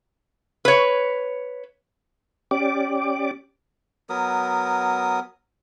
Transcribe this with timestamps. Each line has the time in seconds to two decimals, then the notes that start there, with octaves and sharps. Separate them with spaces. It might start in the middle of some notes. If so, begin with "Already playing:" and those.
0.65 B4 C#5
2.51 C#4 G4 D5 D6
4.09 F#3 B3 A#4 D#6